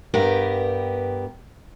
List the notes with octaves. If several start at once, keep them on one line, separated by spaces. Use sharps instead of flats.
G2 B3 G4 A#4